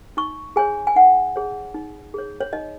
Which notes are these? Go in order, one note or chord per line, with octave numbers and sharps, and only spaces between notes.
D#4 C#6
G#4 C#5 G#5
G#5
D#4 F#5
G#4 C#5
D#4
G#4 C#5
C#5
D#4 D#5